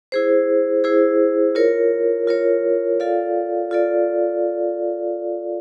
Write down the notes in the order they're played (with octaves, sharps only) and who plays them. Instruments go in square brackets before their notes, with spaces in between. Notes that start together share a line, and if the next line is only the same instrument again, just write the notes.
[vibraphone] E4 G#4 C5
E4 G#4 C5
F4 A#4 C#5
F4 A#4 C#5
F4 A4 D5 F5
F4 A4 D5